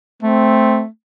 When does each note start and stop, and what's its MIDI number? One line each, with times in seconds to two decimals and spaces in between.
0.23 0.86 57
0.23 0.83 60